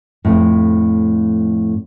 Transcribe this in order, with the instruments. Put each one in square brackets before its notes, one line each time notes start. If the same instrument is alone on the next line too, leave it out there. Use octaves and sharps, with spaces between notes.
[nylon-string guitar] F2 A2